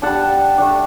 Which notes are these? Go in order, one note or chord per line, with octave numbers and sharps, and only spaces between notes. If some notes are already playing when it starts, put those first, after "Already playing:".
G3 D4 F#5 A5
A3 D4